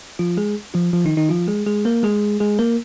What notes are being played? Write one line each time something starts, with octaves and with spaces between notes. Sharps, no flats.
F3 F4
G#3 G#4
F3 F4
F3 F4
D#3 D#4
D#3 D#4
F3 F4
G#3 G#4
G#3 G#4
A#3 A#4
G#3 G#4
G#3 G#4
A#3 A#4